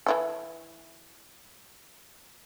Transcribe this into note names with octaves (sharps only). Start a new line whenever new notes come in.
E3 E4 A4